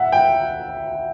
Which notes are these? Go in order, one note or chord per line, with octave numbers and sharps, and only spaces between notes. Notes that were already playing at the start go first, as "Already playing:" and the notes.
Already playing: E5 F#5
G5